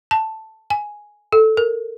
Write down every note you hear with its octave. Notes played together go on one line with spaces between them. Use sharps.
A5
G#5
A4
A#4